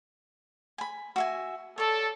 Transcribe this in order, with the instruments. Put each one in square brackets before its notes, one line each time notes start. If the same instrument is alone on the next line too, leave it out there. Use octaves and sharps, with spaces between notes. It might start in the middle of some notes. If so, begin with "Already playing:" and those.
[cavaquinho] G#5 B5
F#4 E5 G#5
[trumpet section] A4 [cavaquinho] C#5 D5